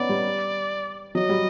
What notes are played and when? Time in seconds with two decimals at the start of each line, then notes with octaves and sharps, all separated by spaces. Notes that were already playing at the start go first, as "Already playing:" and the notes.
Already playing: B3 C#4 D#4 D5
0.09 G3
1.15 F#3 D#5
1.29 G3